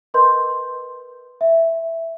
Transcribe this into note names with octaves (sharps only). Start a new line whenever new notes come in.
A#4 B4 D#5 C6 G6
E5